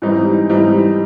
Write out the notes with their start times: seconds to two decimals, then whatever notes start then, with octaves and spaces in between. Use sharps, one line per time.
0.02 G#2 E3 G3 C4 D#4
0.49 G#2 E3 G3 C4 D#4